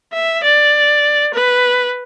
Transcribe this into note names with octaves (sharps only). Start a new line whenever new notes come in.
E5
D5
B4